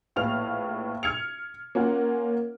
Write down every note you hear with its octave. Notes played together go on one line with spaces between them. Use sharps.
A#1 A2 B3 F5 F6 F7
F6 G#6 C#7 F7
A#3 C#4 F4 F#5